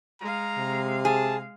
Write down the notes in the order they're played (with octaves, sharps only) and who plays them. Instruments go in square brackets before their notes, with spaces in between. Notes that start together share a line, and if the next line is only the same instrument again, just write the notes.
[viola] G#3 F5 [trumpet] A#5
[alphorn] C3
[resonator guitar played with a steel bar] G#4 [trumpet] A5